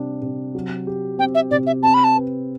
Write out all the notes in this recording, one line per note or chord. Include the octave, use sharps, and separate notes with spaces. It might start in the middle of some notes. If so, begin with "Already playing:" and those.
Already playing: C3 G3 D4
C3
F#3
G4
C4 G5
E5
C3 D5
E5
C4 A5
B5
A5
B4